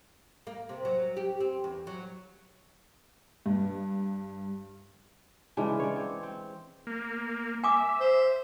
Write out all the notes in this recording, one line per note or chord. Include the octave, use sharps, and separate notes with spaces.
A#3
C3
F#3
G4
C4
E2
F#3
G2
C#3 E3 G#3 D4
C#5 D5
C4 C#5
C4
A#3
E5 G#5 D6 D#6
C5